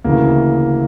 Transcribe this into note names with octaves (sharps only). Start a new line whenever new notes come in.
D2 C#3 E3 A#3